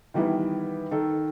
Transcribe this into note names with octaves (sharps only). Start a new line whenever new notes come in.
D#3 E3 G3 B3 E4
D#3 A4